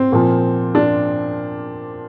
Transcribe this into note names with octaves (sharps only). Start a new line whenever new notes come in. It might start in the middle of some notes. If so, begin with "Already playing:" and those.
Already playing: C4
A#2 F3
D4